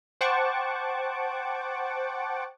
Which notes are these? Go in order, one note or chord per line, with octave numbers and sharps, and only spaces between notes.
C5 F#5 G5 A5 C#6 D6